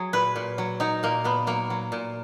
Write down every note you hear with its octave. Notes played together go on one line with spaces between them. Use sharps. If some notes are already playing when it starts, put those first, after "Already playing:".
Already playing: F#3 G#4
A#2 B4
A#2
F#3
F#3 D#4
A#2 A#3
A#2 B3
F#3 A#3
F#3
A#2